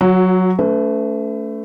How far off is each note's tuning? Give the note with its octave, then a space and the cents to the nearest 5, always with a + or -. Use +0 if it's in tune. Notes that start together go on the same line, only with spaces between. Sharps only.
F#3 +0 F#4 -35
A3 +0 C#4 +35 B4 +35